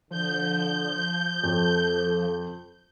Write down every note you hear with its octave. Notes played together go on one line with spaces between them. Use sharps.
D3 F3 G6
F2 A4